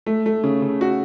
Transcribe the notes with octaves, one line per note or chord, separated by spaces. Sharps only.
A3
A3
C#3
C#3
F#4